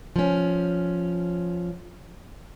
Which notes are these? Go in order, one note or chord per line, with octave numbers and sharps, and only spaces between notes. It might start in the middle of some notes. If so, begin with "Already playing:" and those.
F3 C#4